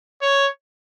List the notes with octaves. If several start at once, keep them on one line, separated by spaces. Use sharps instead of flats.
C#5